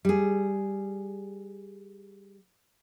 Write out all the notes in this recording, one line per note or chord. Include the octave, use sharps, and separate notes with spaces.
G3 G#4